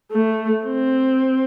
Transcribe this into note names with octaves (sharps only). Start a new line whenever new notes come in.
A3
C4